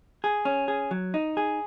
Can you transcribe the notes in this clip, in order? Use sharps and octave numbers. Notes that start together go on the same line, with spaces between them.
G#4
C#4
G#4
F#3
D#4
G#4